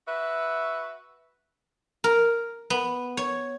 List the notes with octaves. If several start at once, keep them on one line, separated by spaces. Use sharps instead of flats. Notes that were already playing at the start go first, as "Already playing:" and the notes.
F#4 B4 E5
A#4
B3
C#5